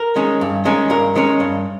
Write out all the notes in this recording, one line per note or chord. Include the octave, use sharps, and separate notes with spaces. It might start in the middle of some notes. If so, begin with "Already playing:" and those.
Already playing: A#4
D#3 G#3 C#4
G2
D#3 G#3 C#4
G2 A#4
D#3 G#3 C#4
G2